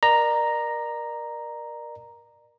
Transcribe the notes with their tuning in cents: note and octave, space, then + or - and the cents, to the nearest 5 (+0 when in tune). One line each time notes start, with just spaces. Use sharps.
A#4 +25 D5 +35 A#5 +0